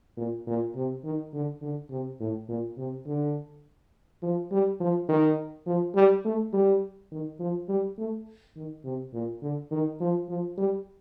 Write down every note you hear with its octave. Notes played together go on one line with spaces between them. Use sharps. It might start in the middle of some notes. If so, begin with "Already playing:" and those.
A#2
A#2
C3
D#3
D3
D3
C3
A2
A#2
C3
D3
F3
G3
F3
D#3
F3
G3
A3
G3
D#3
F3
G3
A3
D#3
C3
A#2
D3
D#3
F3
F3
G3